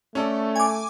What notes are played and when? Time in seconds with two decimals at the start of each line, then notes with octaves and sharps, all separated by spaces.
0.15 A3 C#4 A4 D5
0.56 G#5 D6